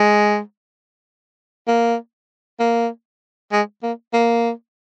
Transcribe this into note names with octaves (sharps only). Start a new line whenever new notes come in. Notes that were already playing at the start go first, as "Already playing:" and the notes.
Already playing: G#3
A#3
A#3
G#3
A#3
A#3